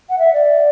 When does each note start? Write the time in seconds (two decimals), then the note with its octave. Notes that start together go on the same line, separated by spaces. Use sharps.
0.09 F#5
0.18 E5
0.33 D5